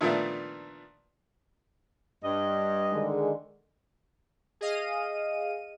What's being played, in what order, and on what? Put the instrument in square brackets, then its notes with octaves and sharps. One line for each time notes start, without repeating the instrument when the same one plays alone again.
[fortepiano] A#2 D3 D#3 F3 A3 B3
[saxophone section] G2 D#5
[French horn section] D3 D#3 G#3
[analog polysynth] G#4 D#5 F5 D#7